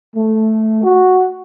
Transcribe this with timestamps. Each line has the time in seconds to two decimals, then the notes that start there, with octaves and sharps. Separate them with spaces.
0.16 A3
0.84 F#4